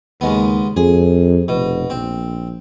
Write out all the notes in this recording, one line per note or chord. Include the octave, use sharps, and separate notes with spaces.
D#2 C#3 G#3 B3
F2 G#4
F1 B2
A#1 C4